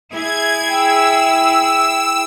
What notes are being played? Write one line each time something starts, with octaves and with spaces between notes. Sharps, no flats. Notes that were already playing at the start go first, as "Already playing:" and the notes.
E4 G#4 G#6
G5 E6